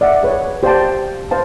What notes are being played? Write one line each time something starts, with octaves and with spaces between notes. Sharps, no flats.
D5 E5 F#5
G#4 B4 C#5
G4 C5 D5 F5 G5 A5
B4 C5 F5 A5